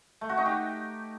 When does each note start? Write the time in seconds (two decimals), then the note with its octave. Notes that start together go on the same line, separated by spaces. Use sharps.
0.21 A3
0.29 F#4
0.37 D#4
0.46 G4